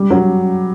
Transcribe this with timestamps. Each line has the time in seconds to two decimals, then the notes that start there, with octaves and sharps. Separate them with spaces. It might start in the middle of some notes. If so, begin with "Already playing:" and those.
Already playing: G3
0.10 F#3